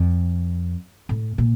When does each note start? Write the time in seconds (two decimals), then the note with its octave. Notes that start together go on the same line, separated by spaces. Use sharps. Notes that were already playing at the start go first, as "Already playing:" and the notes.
Already playing: F2
1.09 A2
1.38 A#2